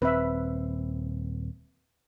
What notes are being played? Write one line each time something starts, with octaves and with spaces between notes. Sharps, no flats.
D#1 C4 B4 E5